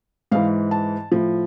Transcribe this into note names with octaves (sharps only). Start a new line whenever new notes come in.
G#2 E3 F5
A5
A2 F3